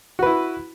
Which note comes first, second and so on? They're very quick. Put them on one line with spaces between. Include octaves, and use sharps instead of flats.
F#4 B4 E4